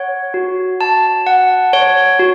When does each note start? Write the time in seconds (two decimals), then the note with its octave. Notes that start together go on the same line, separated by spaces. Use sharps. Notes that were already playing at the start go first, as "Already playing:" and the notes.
Already playing: C#5 F#5
0.34 F#4
0.81 A5
1.27 F#5
1.73 C#5
2.19 F#4